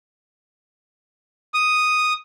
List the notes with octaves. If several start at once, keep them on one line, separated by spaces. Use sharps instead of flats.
D#6